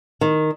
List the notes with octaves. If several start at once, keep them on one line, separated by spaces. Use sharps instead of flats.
D#3